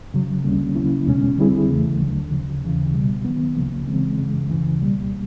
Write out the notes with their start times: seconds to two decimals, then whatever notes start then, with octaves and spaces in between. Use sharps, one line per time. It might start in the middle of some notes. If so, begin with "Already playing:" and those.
0.13 F#2 C#3 F#3
0.44 D2 D3 G3 A#3 C#4
0.75 C#3 F#3 A#3 C#4 E4
1.06 E2 B2 G#3 C#4
1.38 D3 G3 C4 E4 G#4
1.68 E2 C#3 E3 A3
2.00 D2 D3 F#3
2.31 D2 C#3 F3
2.62 D#2 C#3 E3
2.93 C2 B2 G3
3.25 D#3 F#3 B3
3.55 C#2 C#3 F3 A#3
3.87 C#3 E3 G#3 C4
4.18 F#2 C#3 E3 G#3
4.49 D2 C#3 E3
4.80 C#2 B2 G3 A#3